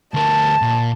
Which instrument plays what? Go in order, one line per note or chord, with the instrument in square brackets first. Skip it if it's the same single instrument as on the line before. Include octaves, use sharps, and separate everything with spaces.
[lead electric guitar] D2 A#4 [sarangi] A5
[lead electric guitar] A#2